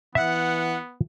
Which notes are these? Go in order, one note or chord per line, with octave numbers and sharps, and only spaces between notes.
E3 B3 E5 F#5